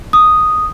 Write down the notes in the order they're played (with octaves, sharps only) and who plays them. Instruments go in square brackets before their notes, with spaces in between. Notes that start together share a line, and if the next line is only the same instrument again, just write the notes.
[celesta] D#6